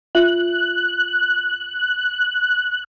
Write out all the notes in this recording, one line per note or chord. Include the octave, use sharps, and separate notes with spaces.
F4 E5 F#6